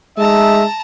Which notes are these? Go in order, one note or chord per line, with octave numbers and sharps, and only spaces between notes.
G#3 A3 D#4 E5 A5 A#5